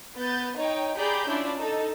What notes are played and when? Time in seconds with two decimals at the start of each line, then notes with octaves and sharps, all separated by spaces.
0.17 B3 G6 A6
0.56 D#4 C#5 G5
0.96 G4 G#4 D5 A#5 B5 G6
1.27 C#4 D4 E4 F4 D5
1.57 D#4 A4